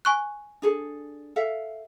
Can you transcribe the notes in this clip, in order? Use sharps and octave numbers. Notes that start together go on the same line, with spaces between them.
G#5 C#6 F#6
D4 G#4 A4
A4 E5 F5